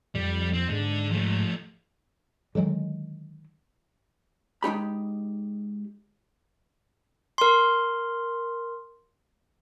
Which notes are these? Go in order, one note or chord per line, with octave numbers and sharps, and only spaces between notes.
F2 G3
C4
G#2 D3
F3 A3
D3 D#3 F#3 G#3
G#3 D#4 G4 B5
A#4 C6